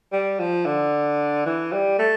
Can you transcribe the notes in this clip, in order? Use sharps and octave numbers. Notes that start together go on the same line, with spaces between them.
G3
F3
D3
E3
G3
A3